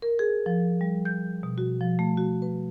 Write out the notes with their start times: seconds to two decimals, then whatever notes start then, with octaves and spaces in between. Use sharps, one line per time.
0.02 A#4
0.19 G#4
0.46 F3
0.81 G3
1.05 G6
1.43 B2
1.58 F#4
1.81 F3
1.99 A3
2.17 F#4
2.42 B4